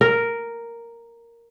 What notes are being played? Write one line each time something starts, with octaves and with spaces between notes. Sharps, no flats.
A#4